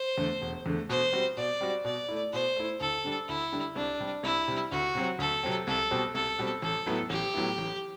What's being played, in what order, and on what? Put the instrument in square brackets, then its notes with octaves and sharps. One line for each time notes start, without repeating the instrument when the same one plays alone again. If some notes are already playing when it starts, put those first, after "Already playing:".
Already playing: [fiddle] C5
[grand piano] E2 D3 A3
E1
E2 D3 A3
[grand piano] B2 [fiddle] C5
[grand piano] G3 C4 F#4
[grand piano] B2 [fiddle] D5
[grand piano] G3 C4 F#4
[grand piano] B2 [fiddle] D5
[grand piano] A3 E4
[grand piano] B2 [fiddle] C5
[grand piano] A3 E4
[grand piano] D2 [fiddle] A4
[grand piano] D3 G3 D4
[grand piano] D2 [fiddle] E4
[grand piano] D3 G3 D4
[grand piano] C2 [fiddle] D4
[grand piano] C3 G3
[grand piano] C2 [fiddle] E4
[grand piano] C3 G3
[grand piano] D2 [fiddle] F#4
[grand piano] C3 F#3 C4
[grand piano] D2 [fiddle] A4
[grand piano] C3 F#3 C4
[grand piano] C2 [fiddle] A4
[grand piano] B2 G3 C4
[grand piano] C2 [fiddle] A4
[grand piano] B2 G3 C4
[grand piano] A1 [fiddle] A4
[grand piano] A2 F#3 B3 E4
[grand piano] A1 [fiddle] G4
[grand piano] A2 F#3 B3 E4
A1